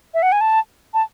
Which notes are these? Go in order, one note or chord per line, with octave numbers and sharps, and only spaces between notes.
E5
F#5
G#5
A5
A5